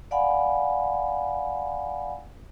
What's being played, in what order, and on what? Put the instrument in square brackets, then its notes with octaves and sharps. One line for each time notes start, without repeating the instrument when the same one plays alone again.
[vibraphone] D5 F5 F#5 G#5 B5